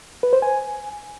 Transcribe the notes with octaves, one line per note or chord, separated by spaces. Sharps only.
B4
C5
G#5